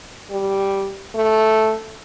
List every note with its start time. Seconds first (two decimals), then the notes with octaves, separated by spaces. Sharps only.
0.31 G3
1.15 A3